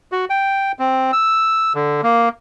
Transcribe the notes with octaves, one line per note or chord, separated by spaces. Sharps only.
F#4
G5
C4
E6
D3
A#3